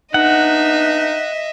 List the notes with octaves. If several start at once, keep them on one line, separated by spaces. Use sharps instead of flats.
B3 D4 D#4 D#5 E5 F#5